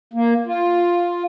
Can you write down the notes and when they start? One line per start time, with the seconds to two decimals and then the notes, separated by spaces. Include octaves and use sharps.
0.13 A#3
0.47 F4